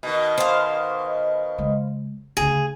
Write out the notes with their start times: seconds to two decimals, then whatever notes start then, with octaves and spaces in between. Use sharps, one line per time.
0.03 B2 D#3
0.38 C5 F5
1.58 C#3 G#3
2.37 D2 C#3 G#4